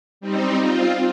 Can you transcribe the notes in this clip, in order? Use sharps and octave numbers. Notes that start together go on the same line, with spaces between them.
G3 C4 D#4
C4 F4